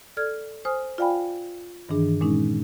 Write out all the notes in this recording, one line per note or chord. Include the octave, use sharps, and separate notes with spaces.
A4 D5 F6 G#6
C5 G#5 D#6 F6
F4 D5 F5 G5 G#5 B5
G2 D#3 E3 D4 G#4
A#2 G#3 C#4 D#4